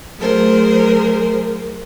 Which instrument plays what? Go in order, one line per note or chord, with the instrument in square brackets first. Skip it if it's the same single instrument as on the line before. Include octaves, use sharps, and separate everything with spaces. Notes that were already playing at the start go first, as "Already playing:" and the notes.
[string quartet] F#3 A3 G#4 A#4 C5